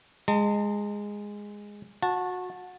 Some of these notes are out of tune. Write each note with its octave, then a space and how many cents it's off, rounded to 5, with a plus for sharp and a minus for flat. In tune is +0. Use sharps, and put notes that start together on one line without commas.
G#3 -10 A5 +45
F#4 -25 A5 +0